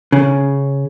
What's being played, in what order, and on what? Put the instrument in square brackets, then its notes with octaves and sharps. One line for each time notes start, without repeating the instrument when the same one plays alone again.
[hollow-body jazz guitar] C#3